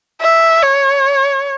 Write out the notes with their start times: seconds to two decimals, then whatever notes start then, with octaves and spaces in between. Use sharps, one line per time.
0.21 E5
0.62 C#5